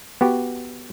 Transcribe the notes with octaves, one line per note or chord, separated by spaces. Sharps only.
B3 F#4 G4